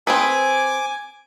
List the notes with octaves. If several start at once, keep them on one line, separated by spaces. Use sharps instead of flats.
C4 G#4 B4 G#5 D6